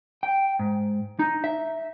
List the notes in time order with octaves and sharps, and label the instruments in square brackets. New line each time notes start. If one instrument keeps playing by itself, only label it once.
[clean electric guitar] G5
G#2
D#4
E5